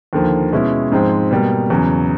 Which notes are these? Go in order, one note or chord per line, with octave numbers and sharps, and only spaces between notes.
D#2 D3 F3 A#3
B2 G#3 C#4 E4
G#2 F3 G#3 C4
B2 G3 A#3
E2 C#3 F#3